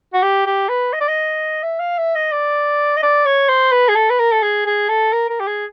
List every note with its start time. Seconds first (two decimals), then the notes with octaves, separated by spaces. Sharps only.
0.14 F#4
0.23 G4
0.46 G4
0.69 B4
0.93 D#5
1.01 D5
1.08 D#5
1.63 E5
1.80 F5
1.98 E5
2.15 D#5
2.32 D5
2.97 D#5
3.03 D5
3.26 C#5
3.49 C5
3.72 B4
3.89 G#4
3.95 A4
4.10 B4
4.19 A#4
4.32 A4
4.42 G#4
4.66 G#4
4.89 A4
5.13 A#4
5.30 A#4
5.40 G4
5.47 G#4